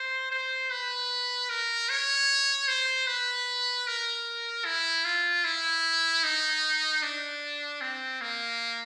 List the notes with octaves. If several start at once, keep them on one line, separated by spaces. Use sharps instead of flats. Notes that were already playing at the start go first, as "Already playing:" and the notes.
Already playing: C5
C5
B4
A#4
C#5
C5
B4
A#4
E4
F4
E4
D#4
D4
C4
A#3